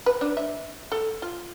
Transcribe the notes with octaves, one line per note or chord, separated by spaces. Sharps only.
B4
D4
E5
A4
F4